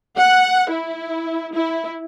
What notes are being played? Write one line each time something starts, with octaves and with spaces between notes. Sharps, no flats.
F#5
E4
E4